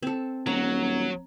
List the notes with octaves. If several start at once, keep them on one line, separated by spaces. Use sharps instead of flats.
C4 A4
D#1 F#3 A#5